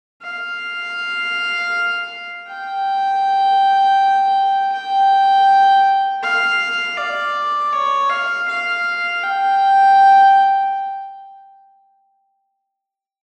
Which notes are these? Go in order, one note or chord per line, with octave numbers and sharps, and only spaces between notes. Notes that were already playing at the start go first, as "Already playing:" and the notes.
F5
G5
G5
F5
D5
C#5
F5
F5
G5